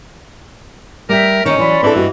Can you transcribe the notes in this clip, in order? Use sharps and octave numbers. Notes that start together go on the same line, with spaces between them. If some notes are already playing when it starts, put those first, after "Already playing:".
G3 A#4 E5 G5
D#3 C#4 D#4
E3 F#3 D5 B5 C6
E3 C4 D4 A4
G2 F#4 D#5